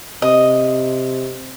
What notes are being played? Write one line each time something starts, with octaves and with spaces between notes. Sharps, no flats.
C3 D#5